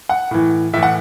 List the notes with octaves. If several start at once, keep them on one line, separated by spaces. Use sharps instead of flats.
F#5
A2 E3
A2 E3 E5
F#5